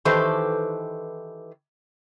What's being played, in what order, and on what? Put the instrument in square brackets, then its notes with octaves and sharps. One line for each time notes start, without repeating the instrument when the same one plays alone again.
[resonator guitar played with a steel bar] D#3 E3 G4 A4 B4 C5